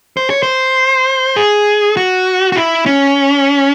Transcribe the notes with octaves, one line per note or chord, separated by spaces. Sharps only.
C5
C#5
C5
G#4
F#4
F#4
E4
C#4